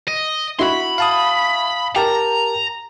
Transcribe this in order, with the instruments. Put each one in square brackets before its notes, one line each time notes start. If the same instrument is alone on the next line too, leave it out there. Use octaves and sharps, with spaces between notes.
[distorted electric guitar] D#5
[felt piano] E4 F#4 [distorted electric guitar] B5 C6
[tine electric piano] F5 A5 D#6
[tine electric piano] G4 A#4 A5 [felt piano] G5 [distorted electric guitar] A#5